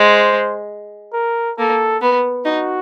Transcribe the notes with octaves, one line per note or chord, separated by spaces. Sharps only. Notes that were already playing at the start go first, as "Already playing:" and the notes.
Already playing: G#3 C5
A#4
A#3 A4
B3
D#4 F#4